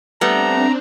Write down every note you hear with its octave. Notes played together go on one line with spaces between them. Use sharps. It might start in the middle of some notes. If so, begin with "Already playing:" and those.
G3 A3 B3 C4 D4 A#5